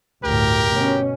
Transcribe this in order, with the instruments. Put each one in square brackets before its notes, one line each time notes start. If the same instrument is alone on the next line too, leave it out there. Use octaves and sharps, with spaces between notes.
[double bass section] G1 D2 A2 [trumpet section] G4 A#4
[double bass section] B2 C#4